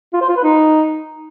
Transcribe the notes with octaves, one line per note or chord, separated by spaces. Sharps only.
F4
C5
F4
B4
D#4